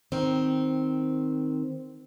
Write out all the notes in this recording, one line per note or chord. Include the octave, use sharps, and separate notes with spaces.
D#3 C4